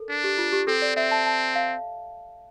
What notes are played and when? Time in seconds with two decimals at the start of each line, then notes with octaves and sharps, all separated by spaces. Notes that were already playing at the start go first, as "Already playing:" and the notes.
Already playing: A4 A#4
0.09 D4
0.24 G4
0.38 F4
0.52 G4
0.67 C4 A4
0.82 D5
0.96 C4 E5
1.11 A5
1.26 A5
1.55 F5